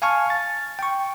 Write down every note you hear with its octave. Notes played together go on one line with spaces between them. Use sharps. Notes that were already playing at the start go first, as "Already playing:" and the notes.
F5 G#5 A5 C#6 F6
A6
G5 C#6